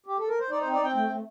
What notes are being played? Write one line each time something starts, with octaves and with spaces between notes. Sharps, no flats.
G4
A4
A#4
C5
D#4 D5
C5
C4
D5
C4 G5
A3 G5
A3